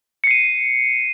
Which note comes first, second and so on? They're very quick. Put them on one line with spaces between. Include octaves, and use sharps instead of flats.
C#7 C7 D#7